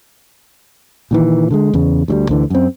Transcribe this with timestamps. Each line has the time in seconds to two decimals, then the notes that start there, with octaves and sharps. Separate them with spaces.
1.11 A#2 D#3 E3
1.51 D3 G3 G#3
1.74 E2 C#3
2.08 D2 F#3 G3
2.29 D2 D3 E3
2.50 F#2 C4